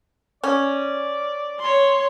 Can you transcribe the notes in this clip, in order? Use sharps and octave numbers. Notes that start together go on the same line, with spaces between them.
C#4 D5
C#5 C6